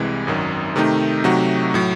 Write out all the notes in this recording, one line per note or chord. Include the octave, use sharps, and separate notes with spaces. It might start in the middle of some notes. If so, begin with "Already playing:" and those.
Already playing: C2 C3 E3 G#3
G#1 F#2 D#3 F#3
C3 D#3 A3 D#4
C3 F#3 A3 D#4 F#4
A2 F#3